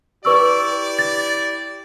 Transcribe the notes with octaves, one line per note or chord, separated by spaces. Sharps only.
E4 G4 B4 D5 C#6 E6
A6